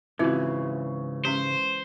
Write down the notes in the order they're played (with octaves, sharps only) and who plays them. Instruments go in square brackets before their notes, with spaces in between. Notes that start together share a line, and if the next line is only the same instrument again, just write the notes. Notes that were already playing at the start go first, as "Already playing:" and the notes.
[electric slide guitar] G#2 C#3 [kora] E3 [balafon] C4 F4 F#4
[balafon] G#3 C#4 G4 [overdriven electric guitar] C5